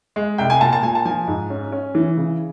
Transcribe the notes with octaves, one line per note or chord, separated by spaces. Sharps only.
G#3
C2 G5
G#5
A#2 A5
A5
A#2 G#5
A5
F3 G#5
G#2
C#4
C#4
E3
C#3